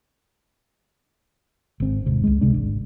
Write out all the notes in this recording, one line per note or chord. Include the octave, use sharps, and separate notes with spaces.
G#1 C4
D#1 G#2 C3
C#2 G#3
D1 C3 G#3 D4
G#1